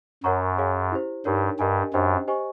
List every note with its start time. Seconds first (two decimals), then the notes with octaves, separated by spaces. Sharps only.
0.23 F#2 A#4 C#5 F#5 A#5 C#6
0.58 G#4 C#5 F5 G#5
0.92 E4 G4 C5
1.25 G2 D#4 G4 A#4 C#5
1.59 G2 G4 A#4 D#5 G#5
1.93 F#2 D4 G4 C5 D#5 G5
2.28 G4 C5 D#5 G#5 C#6